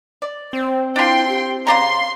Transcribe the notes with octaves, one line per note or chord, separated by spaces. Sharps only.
D5
C4 C5
D4 E4 F4 G5 C6
G4
C#3 D5 F5 A#5 C6